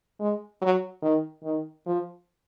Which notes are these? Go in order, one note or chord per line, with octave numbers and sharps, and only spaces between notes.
G#3
F#3
D#3
D#3
F3